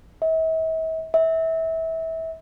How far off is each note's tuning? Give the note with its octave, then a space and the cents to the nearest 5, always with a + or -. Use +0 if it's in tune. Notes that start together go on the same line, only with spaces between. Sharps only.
E5 -45
E5 -25